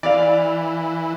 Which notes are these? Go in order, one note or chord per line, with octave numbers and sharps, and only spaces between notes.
E3 D5 F5